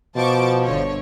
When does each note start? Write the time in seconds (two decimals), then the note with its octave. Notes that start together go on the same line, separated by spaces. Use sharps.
0.16 B2 F3 A5 C#6 D6
0.64 G1 D3 C#5